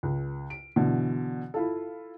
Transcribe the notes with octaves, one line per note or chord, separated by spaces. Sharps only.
C#2
D7
B2 D3 E3
E4 F4 A4